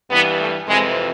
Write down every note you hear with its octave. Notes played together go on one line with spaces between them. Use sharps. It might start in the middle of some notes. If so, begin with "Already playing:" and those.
G2 E3 B3
A3
F2 C3 E3 G#3